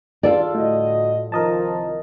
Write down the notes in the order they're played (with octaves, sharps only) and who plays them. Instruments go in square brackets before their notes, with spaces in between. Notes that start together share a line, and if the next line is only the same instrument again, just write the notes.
[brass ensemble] D#3 D4 G#4 [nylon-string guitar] F4 A4 D5
[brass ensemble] D2 G3 D#5 [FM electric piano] A2 [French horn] F#4
[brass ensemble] C2 D#3 [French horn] F3 [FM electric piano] A#4 D#5 A5